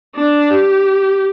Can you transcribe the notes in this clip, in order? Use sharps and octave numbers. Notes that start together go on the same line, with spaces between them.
D4
G4